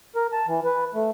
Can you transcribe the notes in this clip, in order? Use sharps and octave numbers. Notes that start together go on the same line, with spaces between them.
A#4
A5
E3
B4
A3